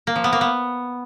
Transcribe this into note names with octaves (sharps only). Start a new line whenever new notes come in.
A#3
F3
B3
A#3
B3